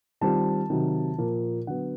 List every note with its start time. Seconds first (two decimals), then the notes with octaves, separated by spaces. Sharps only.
0.21 D#3 G3 C4 F4 A5
0.70 C3 D#3 F#3
1.18 A#2 F3 A#3
1.67 D3 F#3 B3 F#5